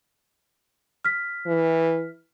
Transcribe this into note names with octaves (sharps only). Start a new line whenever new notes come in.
F6 B6
E3